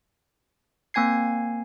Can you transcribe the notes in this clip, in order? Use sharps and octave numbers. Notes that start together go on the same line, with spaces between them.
A#3 C4 G#5 G#6 C7